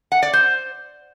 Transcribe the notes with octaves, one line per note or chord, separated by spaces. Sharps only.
F#5
D5
C5